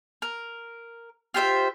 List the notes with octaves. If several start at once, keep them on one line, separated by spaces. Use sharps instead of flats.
A#4
F4 G4 C5 E5